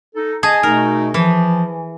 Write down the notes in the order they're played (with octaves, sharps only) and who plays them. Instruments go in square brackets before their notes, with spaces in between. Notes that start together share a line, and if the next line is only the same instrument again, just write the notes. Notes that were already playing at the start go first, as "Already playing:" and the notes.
[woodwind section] D#4 A4
[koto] G#4 [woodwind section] D#5 A5
[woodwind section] B2 A3 D#4 [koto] A#4
[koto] E3 [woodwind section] F3